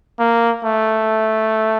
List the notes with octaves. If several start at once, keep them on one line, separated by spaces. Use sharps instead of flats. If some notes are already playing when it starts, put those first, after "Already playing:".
A#3
A3